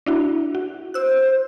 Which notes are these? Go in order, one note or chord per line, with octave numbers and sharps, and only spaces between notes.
D4 E4 F#4
F#4
C5 E6 F#6